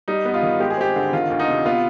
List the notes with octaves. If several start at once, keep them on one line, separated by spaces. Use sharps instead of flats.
G3 D#4
B3
F4
D#3
G#3 G4
G#4
C4 G4
D3
D#3 F4
D2
D#4
C3
B3 F4